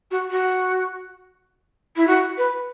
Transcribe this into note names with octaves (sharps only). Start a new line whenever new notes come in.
F#4
F#4
E4
F#4
B4